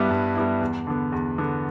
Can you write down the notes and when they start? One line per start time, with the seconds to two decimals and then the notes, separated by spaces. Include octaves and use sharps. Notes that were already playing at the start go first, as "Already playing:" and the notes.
Already playing: G2 G3 B3 E4
0.10 G2
0.35 G3 B3 E4
0.61 E2
0.87 D3 B3
1.12 E2
1.38 D3 B3